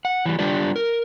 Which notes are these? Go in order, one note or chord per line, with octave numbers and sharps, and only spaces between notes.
F#5
E3 G3
G3 D4 F4 G4 D5
A#4